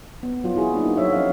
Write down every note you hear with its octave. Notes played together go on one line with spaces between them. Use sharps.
B3
F#3 F4
E4 F#4 G#4
A#3 D4 D#4 F#4
F#3 F#4 C5 C#5 E5
F3 C#4 C#5 D#5 F5